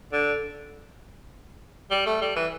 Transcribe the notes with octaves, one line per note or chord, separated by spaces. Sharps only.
D3
G3
A3
G3
E3